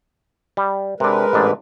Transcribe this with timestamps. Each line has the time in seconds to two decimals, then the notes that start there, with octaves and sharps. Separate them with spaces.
0.57 G3
1.00 C3 G#3 D4 A#4 B4
1.33 A1 G#2 D4